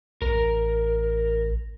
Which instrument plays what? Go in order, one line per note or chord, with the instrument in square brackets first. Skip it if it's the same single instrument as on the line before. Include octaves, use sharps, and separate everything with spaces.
[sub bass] A1 [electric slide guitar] A#4